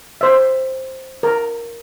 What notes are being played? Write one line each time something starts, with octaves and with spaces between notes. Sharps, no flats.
C5 E5
A#4